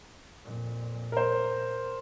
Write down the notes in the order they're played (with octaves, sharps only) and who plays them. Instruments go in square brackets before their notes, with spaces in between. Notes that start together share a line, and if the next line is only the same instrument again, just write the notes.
[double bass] F2 A#2
[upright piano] A#4 C5